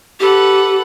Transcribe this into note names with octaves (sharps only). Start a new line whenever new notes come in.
G4 A4 B4 F#5